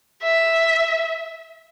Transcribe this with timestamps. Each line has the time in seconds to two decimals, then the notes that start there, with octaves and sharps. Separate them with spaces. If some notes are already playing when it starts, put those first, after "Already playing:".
0.23 E5